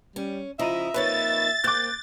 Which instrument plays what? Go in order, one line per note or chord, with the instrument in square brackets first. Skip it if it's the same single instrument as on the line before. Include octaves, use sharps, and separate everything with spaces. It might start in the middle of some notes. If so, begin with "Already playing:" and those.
[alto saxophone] G3 [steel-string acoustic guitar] C#4
[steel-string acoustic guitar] C#3 F3 E4 [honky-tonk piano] D#5 A#5 D#7 [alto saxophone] E5
[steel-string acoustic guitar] F2 A#3 D#4 [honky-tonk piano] B4 C#5 [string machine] A6
[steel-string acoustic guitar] A#3 C4 [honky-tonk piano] D6 F#6 G6